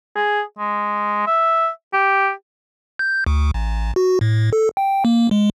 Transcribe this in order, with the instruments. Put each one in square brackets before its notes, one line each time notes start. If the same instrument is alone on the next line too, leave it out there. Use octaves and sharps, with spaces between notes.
[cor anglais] G#4
G#3
E5
G4
[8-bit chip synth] G6
D2
A1
F#4
A2
A4
G5
A#3
G#3